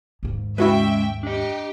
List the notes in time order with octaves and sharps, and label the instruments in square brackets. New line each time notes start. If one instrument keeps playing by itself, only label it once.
[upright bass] D#2 G#2
[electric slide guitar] G#3 C#4 [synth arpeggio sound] E4 F#4 B4 [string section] E5 G5
[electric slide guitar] D4 D#5 [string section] G4